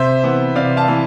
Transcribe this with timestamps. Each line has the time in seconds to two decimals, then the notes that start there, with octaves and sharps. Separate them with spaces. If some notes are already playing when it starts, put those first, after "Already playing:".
Already playing: C3 C5 E5
0.23 E3 B3
0.56 C3 D5 F5
0.77 F5 A5
0.88 E3